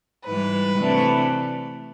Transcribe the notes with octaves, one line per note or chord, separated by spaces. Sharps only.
G#2 E3 G3 B4
C3 E3 A3 D4